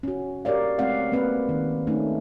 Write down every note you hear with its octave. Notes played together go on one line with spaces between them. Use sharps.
C#4 F#4
G4 A#4 C#5 D5 F5
G#3 A3 C4 A#4 F5 F#5
A#3 C4 B4 F5
D#3
A3 C#4 D#4